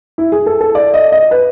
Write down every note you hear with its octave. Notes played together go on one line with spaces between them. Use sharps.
E4
G#4
A4
A4
D5
D#5
D#5
B4